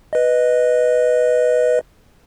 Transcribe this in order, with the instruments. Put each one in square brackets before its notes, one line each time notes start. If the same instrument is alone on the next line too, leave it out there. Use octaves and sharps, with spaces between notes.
[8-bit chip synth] B4 D#5